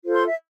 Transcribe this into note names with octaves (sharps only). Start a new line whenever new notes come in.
F4 A4 C5
C6
E5